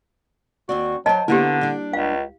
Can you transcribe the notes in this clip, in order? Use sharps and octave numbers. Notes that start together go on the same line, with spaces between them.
D#2 C4 F#4 D5
F#3 C5 D#5 G5 A5
D3 A#3 B3 D4 E4 G4
G3 D4
C#2 F5